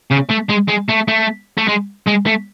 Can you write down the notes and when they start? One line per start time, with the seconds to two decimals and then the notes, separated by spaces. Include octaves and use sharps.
0.11 C#3
0.30 A3
0.50 G#3
0.69 G#3
0.89 A3
1.08 A3
1.57 A3
1.68 G#3
2.07 G#3
2.26 A3